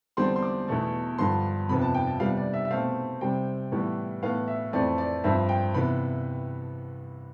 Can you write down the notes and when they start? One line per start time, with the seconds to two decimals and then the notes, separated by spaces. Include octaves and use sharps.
0.17 E2 D3 G3 C4 C6
0.36 C6
0.43 D6
0.68 E2 B2 A3
1.18 G2 D3 F3 C6
1.69 F2 C3 F3 B3 B5
1.82 A5
1.94 G5
2.07 A5
2.20 C3 G3 B3 F5
2.37 D5
2.54 E5
2.65 E5
2.71 B2 A3 C4 F5
3.21 C3 G3 C4 G5
3.72 A2 E3 G3 B3
4.22 A2 E3 B3 F5
4.48 E5
4.73 F2 E3 A3 C4 D5
4.98 D5
5.24 G2 F3 C4 E5
5.49 G5
5.74 C3 E3 B3 B5